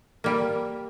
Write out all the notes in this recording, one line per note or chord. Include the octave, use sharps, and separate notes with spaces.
G3 A#3